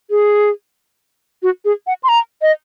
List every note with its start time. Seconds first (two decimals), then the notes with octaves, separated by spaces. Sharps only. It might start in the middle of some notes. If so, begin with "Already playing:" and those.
0.10 G#4
1.43 F#4
1.65 G#4
1.87 F#5
2.03 C6
2.09 A#5
2.42 D#5